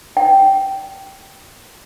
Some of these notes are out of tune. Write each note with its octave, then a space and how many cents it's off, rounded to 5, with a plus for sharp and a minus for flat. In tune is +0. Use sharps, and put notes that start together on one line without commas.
G5 -10